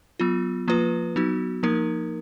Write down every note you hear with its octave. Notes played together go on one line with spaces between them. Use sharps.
F#3 B3 F4
F3 A#3 F4 B4
F#3 B3 D#4 F#4
F3 A#3 D#4 A#4